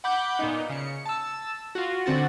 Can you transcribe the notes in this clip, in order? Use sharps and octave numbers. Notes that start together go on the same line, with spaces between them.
F#5 B5 D6 G6
A#2 B3 D#4
C#3 C#7
A5 E6
F4 F#4
D3 C4 F#4 A6